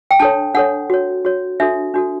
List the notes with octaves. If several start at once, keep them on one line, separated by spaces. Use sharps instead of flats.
G5
D4 A4 C#5 A5
D4 A4 C#5 F#5
F#4 C#5
F#4 C#5
D4 F#4 A4 E5
D4 F#4 A4